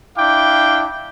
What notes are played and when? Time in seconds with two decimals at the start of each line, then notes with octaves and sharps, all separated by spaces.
0.17 D4 E4 F5 G5 D6